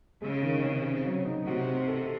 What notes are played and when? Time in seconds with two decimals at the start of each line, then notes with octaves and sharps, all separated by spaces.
0.22 C#3 G#3
0.43 D#3
0.63 C3
0.85 C4
1.05 F#3
1.25 D#4
1.46 C3 F#4
1.67 C4
1.88 A4